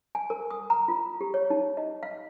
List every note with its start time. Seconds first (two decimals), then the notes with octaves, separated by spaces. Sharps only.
0.15 G#5
0.30 A#4
0.50 D#6
0.70 A#5
0.88 F4
1.21 G4
1.34 C#5
1.50 D#4
1.77 D#5
2.03 F5